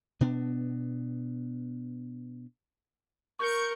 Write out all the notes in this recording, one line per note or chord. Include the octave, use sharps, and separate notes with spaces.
B2 B3 D4
A#4 C#6 G6 C#7